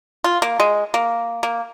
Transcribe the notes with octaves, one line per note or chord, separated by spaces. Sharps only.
F4
A#3
G#3
A#3
A#3